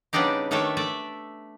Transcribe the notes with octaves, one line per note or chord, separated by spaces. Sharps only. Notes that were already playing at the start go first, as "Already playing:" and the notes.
C#3 G3 B3 D4 D#4 G4
D#3 A3 D4 A4 C#5 E5
A3 D5 E5